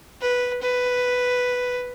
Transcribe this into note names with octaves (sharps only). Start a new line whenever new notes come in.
B4
B4